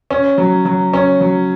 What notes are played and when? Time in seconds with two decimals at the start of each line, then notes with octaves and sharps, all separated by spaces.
0.11 C#4
0.38 F#3
0.65 F#3
0.93 C#4
1.21 F#3